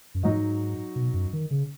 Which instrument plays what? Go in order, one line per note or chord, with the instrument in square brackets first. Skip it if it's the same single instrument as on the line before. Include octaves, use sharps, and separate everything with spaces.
[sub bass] F#2
[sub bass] G#2 [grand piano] F#3 D#4 F#4 D#5
[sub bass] B2
F#2
D#3
C#3